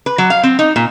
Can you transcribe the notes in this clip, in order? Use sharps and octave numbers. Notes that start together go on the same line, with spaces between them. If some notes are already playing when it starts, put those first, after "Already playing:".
B4
F#3
F5
C4
D#4
A#2